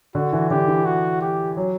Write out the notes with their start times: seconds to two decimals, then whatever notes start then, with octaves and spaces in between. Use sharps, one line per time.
0.15 D3 F#4
0.33 E3
0.50 D3 G4
0.68 E3
0.85 F#4
1.21 G4
1.57 F#3